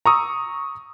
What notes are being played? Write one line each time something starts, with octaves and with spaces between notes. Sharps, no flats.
A#5 C#6 D#6 E6